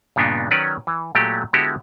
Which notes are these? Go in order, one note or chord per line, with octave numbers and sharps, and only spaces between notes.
G2 A#2 C#3 B3 D4 D#4
D#3 F#3 C#4 B4 C#5 D5
E3
A#2 F#3 G#3 A3 G4 G5
D3 G#3 B3 E4 F#4 G4